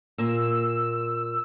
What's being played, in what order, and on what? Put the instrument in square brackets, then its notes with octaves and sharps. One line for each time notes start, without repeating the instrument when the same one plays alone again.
[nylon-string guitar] A#2 A#3 [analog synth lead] E6